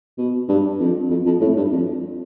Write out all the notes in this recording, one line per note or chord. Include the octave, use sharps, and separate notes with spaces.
B2
G2
F2
F2
F2
A2
G2
F2